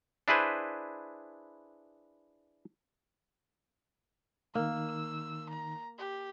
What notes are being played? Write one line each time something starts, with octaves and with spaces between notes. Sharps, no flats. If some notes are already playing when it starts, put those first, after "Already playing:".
D4 E4 G#4 B4 C5
D#3 A#3 D#4 E6
A#5
G4